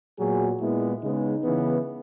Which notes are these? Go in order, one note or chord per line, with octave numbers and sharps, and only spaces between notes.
A#2 F#3 B3 G#4
A#2 G#3 B3 E4
C#3 G#3 B3 D#4
C#3 E3 B3